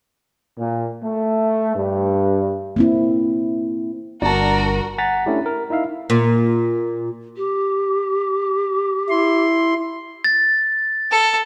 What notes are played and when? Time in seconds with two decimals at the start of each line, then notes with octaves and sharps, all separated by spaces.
0.57 A#2
1.03 A3
1.75 G2
2.76 A#3 C4 E4
4.22 G1 D4 F#4 A#4 A5 A#5
4.98 F#5 G#5 A#5 A6 B6
5.26 A3 C#4 D4 E4 G4
5.46 A#4
5.70 D#4 E4 E5 F5
6.10 A#2
7.36 G4
9.10 E4 C6
10.24 A6
11.11 A4